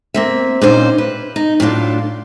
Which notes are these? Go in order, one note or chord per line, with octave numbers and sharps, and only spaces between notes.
A#3 C4 E5
G2 A#2 C#4 D#4 C5
B4
D#4
A2 F#3 D4 F4